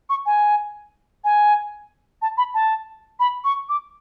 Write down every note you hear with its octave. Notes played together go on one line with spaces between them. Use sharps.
C#6
G#5
G#5
A5
B5
A5
B5
C#6
D6